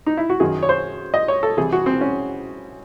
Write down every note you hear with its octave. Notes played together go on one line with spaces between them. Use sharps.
D#4
E4
F#4
F#2 D#3 F#3 G#4
C#5
C5
D#5
C#5
A4
C2 C3 E3 G#4
F#4
C4
C#4